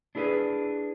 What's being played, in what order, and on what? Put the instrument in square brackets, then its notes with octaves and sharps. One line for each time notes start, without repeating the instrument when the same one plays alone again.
[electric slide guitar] D4 E4 G#4 A#4 B4